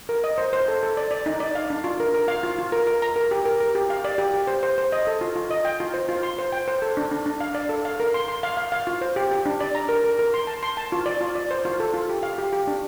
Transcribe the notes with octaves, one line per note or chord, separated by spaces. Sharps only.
A#4
D#5
C5
C5
A4
A4
D5
D5
D#4
D5
F5
D4
F4
A#4
A#4
F5
F4
F4
A#4
A#4
A#5
A#4
G4
A#4
A#4
G4
F5
D5
G4
G4
C5
C5
C5
D#5
A4
F4
F4
D#5
G5
F4
C5
F4
C6
C5
G5
C5
A4
D4
D4
D4
F5
D5
A4
F5
A#4
C6
C6
F5
F5
F5
F4
C5
G4
G4
D4
D5
A#5
A#4
A#4
A#4
C6
A5
C6
A5
F4
D5
F4
D5
C5
F4
A4
F4
G4
F5
G4
G4
D4